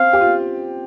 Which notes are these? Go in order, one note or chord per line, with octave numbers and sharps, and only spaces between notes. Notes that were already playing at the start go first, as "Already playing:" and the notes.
Already playing: C4 F5
G4
F4